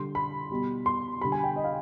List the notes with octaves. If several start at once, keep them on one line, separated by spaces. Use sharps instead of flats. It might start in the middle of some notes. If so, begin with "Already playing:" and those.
Already playing: D3 G3 C6
B5
B2 G3
C6
D3 G3 B5
G#5
G5
D#5
F5